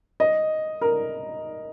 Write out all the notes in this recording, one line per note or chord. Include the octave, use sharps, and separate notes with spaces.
D#5
A#4